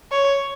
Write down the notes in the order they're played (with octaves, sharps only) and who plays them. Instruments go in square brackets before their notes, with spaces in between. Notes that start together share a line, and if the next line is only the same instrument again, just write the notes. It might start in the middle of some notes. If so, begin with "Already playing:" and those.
[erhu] C#5